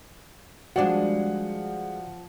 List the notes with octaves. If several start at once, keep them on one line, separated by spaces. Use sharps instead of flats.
F3 G3 G#3 D4 F#4 D5 F#5